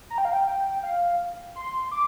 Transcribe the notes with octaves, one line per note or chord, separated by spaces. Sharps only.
A#5
G5
F5
G5
F5
C6
D6